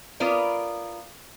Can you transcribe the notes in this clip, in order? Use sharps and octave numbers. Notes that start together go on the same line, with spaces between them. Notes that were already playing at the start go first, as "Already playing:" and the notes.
B3 F4 A#4 D5